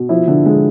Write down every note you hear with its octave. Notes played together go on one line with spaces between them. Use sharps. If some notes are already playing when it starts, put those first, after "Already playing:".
Already playing: B2
F3 E4
D3
G#3